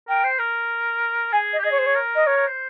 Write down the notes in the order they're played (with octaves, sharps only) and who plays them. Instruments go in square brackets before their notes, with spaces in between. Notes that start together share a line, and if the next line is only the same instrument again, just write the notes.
[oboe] A#4 [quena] G5
[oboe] C5
A#4
[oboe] G#4 [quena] G#5
[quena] D#5
[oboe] G4
[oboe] G#4 [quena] D#5
[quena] C#5
C5
C#5
[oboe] A#4
[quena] D#5
[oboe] A#4 [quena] C#5
[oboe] A#4
C5